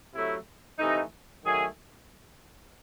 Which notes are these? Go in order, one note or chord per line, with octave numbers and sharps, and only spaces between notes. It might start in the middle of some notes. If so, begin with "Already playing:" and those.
C3 F#3 A3 E4
C3 E3 A3 D#4
D#3 F#3 A3 G#4